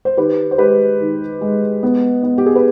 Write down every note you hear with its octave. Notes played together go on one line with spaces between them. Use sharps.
C5
D#3 G4 B4
C5
G#3 G4 B4
D#3
G#3
B3
B3
G4
G#4
B4